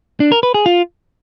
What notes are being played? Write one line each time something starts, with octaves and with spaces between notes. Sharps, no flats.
D4
A#4
B4
G#4
F4